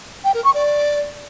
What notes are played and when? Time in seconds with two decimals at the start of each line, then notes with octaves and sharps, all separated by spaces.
0.24 G5
0.34 A#4
0.44 C#6
0.54 D5